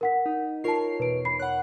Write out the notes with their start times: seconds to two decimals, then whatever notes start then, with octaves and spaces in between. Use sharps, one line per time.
0.01 A#4 F#5 B6
0.26 D#4
0.64 F4 A#4 C#5 A5 C7
1.00 E2 B2 B4 D7
1.25 B5 C7
1.40 C#5 F#5 F#6